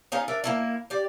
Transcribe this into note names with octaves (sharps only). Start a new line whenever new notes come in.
C#4 D#4 F4 G#4
D4 A#4 E5
A#3 C#4 E4
G4 D5